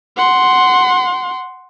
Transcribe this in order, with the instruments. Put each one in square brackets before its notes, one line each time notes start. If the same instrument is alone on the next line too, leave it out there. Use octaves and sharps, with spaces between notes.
[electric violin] F#5 C6